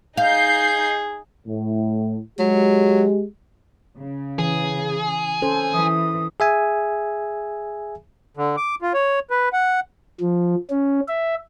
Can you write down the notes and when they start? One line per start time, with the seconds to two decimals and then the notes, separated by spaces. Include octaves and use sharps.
0.17 D#4 G#4 F5 G6 C7
1.46 A2
2.39 F#3 G#3 G4
3.98 C#3
4.39 E3 G#4
5.42 C#4 A4 C5
5.73 E3 D#6
6.40 G#4 E5 G#5
8.37 D3
8.57 D6
8.82 F4
8.94 C#5
9.30 B4
9.53 F#5
10.20 F3
10.70 C#4
11.08 E5